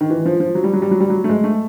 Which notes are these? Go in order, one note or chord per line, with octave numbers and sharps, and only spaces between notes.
D#3
E3
F3
F3
F#3
G3
F#3
G3
F#3
G3
F#3
A3
G#3
A3